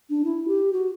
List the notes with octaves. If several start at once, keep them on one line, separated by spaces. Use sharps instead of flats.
D4
E4
G4
F#4